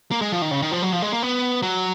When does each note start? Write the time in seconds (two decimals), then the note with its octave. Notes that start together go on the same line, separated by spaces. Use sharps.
0.11 A#3
0.22 G#3
0.32 F3
0.42 D#3
0.51 C#3
0.62 D#3
0.72 F3
0.82 F#3
0.93 F3
1.02 G#3
1.12 A#3
1.23 B3
1.62 F#3